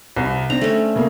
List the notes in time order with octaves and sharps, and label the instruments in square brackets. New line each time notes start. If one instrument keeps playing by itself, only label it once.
[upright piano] C2
[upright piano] C4 D4 [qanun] A#5
[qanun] A3 C#4
[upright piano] C#3 A#3